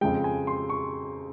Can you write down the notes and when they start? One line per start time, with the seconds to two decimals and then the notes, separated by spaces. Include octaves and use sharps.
0.01 F2 C#3 G#3 G5
0.24 G#5
0.47 C6
0.69 C#6